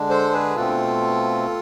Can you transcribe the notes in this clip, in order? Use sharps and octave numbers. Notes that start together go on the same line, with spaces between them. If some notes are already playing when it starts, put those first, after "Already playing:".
Already playing: D3 G#3 D4
A4 C5
G#4 B4
B2 A3 C4 F4 A4